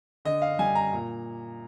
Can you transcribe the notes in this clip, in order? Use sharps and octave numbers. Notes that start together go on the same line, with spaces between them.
D3 D#5
F5
G3 G#5
A#5
A#2